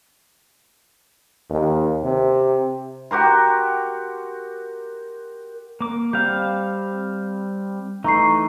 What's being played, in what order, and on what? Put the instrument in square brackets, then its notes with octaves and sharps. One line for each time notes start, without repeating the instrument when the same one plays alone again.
[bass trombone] D#2
C3
[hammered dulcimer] F#4 G4 A#4 C6
[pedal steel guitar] A#3 D6
[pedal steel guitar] G3 C4 F5 [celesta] G6
[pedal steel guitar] E3 A3 D#4 [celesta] A#5 C#6 C7